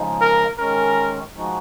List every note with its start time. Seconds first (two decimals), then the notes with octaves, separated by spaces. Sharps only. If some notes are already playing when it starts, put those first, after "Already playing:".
Already playing: C#3 F3 G#3 D#4
0.21 A#4
0.59 D#3 G#3 C#4 A#4
1.35 F3 G#3 D#4 F#4